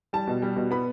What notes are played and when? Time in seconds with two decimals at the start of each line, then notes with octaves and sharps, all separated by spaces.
0.13 G3 A5
0.27 B2
0.42 G3
0.56 B2
0.71 B3 B5